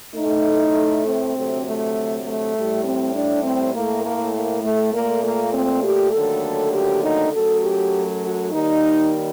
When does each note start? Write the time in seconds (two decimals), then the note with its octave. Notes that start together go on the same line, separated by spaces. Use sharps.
0.15 A2 A3 D#4
1.05 C4
1.34 D2 C3 F#3 A3
1.64 A3
2.24 A3
2.54 A2 G3
2.85 C4
3.14 D4
3.44 C4
3.74 A2 A3 A#3
4.03 A#3
4.34 A#3
4.63 A3
4.93 A#2 A3 A#3
5.23 A#3
5.53 C4
5.83 G4
6.12 D#2 D3 F#3 A3 A4
6.72 G4
7.03 D#4
7.32 F#2 F#3 A3 A4
7.62 G4
8.23 F#4
8.52 D#2 D#3 G3 D#4